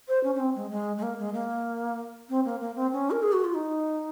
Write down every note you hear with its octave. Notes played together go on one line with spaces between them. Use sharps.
C5
C#4
C#4
C4
G#3
G#3
G#3
A#3
G#3
A#3
C4
A#3
A#3
C4
C#4
A#4
G#4
F#4
F4
D#4